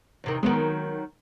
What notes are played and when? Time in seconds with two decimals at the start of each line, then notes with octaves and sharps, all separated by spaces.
0.24 E2 C3 D#3
0.43 D#3 F#3 G#3 B3